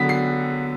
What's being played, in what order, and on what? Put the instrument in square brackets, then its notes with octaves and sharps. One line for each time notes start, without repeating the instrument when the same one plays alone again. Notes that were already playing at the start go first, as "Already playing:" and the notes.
Already playing: [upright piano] D3 F#3 B3 B6
C7